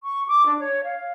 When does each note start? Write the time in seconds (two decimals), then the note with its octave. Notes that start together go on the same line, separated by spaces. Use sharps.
0.04 C#6
0.27 D6
0.46 D4
0.58 C#5
0.83 F5